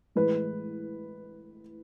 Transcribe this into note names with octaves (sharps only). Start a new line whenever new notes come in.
A2 E3 G#3 B4